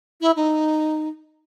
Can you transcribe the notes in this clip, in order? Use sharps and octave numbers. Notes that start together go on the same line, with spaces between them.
E4
D#4